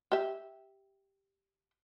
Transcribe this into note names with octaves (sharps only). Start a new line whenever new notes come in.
G4 E5